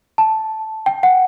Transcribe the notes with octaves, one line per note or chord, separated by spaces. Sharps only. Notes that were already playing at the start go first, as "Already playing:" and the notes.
A5
G5
F#5